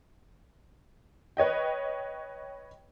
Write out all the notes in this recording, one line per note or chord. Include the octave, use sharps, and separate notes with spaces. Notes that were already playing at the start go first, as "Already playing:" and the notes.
B4 C#5 D#5 G5